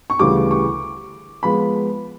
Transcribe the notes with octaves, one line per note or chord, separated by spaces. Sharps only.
C#6
D2 C#3 E3 G3 D6
C#6
F3 G#3 B3 B5